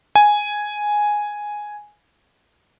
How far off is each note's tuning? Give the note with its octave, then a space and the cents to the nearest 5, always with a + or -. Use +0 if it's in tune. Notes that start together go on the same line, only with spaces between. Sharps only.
G#5 +0